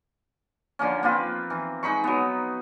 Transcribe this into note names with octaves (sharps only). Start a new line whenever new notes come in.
D3 F3 A#3 C#4
A#3 C4 F4 B4
E3
G#3 D#4 B5 C#6
F#3 B3